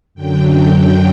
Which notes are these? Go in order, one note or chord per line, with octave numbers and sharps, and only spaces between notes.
F#2 D3 F#3 G5
G5
G5